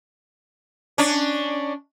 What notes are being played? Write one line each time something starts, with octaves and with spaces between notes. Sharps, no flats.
C#4 D4